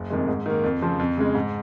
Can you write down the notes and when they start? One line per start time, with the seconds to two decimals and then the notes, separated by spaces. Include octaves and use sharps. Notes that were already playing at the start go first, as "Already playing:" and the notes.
Already playing: F#1
0.10 F2 C3 D#3 G#3
0.28 G#2
0.46 D#3 A#3
0.64 F2
0.82 C#3 F3 C4
0.99 F2
1.17 C#3 G#3
1.35 G#2